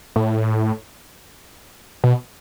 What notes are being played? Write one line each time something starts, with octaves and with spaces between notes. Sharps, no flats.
A2
B2